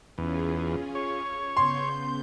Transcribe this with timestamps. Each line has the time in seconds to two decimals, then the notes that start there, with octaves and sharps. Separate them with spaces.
0.18 E2 C#4 F4 G#4
0.95 C#5
1.57 C#3 B3 C6 G6